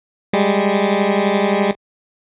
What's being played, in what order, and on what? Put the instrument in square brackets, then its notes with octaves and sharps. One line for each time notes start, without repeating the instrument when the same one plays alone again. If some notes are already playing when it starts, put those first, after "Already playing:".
[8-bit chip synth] G3 G#3